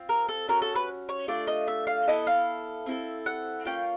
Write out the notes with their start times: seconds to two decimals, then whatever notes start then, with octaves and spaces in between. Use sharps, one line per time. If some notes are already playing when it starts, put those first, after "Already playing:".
Already playing: C4 F4
0.09 A#4
0.29 A4
0.48 C#4 F#4 A4 A#4
0.62 A4
0.76 B4
1.09 C#5
1.28 A3 D4 F4 D5
1.47 D#5
1.68 E5
1.87 F5
2.07 B3 E4 A4 D#5
2.27 F5
2.86 C4 E4 A4
3.26 F#5
3.65 A#3 C#4 F4 G5